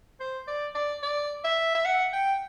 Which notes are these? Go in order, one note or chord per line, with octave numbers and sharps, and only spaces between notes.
C5
D5
D5
D5
E5
E5
F#5
G5